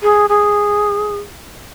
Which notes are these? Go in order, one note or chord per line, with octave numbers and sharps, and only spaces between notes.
G#4
G#4